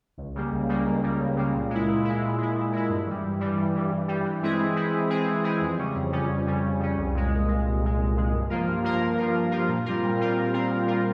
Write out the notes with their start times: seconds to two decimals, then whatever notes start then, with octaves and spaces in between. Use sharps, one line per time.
0.18 C#2
0.35 C#3 G3 A#3
0.52 C#2
0.69 C#3 G3 A#3
0.85 C#2
1.03 C#3 G3 A#3
1.20 C#2
1.36 C#3 G3 A#3
1.54 A#2
1.70 G#3 E4
1.88 A#2
2.05 G#3 E4
2.22 A#2
2.38 G#3 E4
2.55 A#2
2.73 G#3 E4
2.89 G2
3.06 E3 G3
3.24 G2
3.40 E3 G3
3.57 G2
3.75 E3 G3
3.92 G2
4.08 E3 G3
4.25 E3
4.43 G#3 C4 E4 G#4
4.59 E3
4.76 G#3 C4 E4 G#4
4.93 E3
5.10 G#3 C4 E4 G#4
5.27 E3
5.44 G#3 C4 E4 G#4
5.61 F2
5.78 C#3 G3 C#4
5.95 F2
6.12 C#3 G3 C#4
6.29 F2
6.46 C#3 G3 C#4
6.63 F2
6.80 C#3 G3 C#4
6.97 C2
7.14 A#2 G#3
7.31 C2
7.48 A#2 G#3
7.65 C2
7.81 A#2 G#3
7.99 C2
8.16 A#2 G#3
8.33 G2
8.50 F3 A#3 F4 A#4
8.67 G2
8.84 F3 A#3 F4 A#4
9.01 G2
9.18 F3 A#3 F4 A#4
9.34 G2
9.51 F3 A#3 F4 A#4
9.68 A#2
9.86 G3 C4 F4 A#4
10.02 A#2
10.19 G3 C4 F4 A#4
10.37 A#2
10.54 G3 C4 F4 A#4
10.70 A#2
10.87 G3 C4 F4 A#4